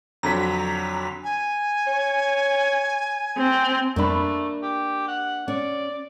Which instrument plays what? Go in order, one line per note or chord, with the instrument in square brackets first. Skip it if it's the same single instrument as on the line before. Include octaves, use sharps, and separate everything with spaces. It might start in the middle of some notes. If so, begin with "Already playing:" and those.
[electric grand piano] F2 D3 F#3 [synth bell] A#5 B6
[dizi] G#5
[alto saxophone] C#5
[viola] C4
[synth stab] F2 G3 B5 [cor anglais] A3 [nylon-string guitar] A#3 D4
[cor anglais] G4
F#5
[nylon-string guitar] C#4 [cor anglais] D5